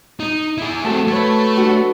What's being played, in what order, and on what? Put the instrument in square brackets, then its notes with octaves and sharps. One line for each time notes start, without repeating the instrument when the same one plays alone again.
[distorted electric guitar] D#4
E4 G#4
[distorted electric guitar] A3 C4 [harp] F#4 A4 A5
[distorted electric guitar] A3 [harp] B4 C#5
[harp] D4 F#4